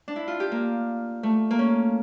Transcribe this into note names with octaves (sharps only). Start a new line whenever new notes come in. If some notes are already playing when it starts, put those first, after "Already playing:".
D4
E4
F4
G4
A#3
A3
A#3
C#4